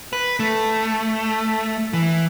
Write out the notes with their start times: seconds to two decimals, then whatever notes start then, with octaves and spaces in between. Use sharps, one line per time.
0.13 B4
0.40 A3
1.93 E3